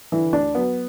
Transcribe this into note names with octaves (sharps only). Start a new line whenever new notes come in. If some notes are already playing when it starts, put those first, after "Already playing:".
D3 E3 E4
D2 D4
F#3 B3